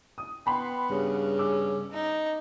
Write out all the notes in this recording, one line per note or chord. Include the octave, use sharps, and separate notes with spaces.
D#6
B3 G5 B5 C6
G2 C#3 G4
C#4 D6 E6
D#4